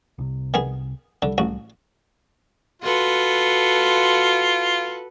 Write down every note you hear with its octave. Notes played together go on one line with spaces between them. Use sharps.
C2 C3
D#3 B3 G#4
C2 D3 G3
A1 F#4
F4 F#4 A4 B4